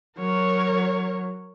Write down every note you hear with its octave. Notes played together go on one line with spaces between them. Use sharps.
F#3 A#4 C#5